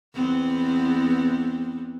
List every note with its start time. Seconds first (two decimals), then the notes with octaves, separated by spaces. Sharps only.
0.14 E2 B3 C4